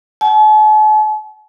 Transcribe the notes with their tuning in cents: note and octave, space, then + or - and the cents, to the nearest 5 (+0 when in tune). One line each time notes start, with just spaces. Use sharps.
F#5 +45 A5 -45